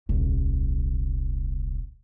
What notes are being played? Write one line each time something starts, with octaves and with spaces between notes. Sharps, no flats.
D#1 C2